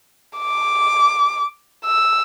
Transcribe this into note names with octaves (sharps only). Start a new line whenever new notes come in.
D6
E6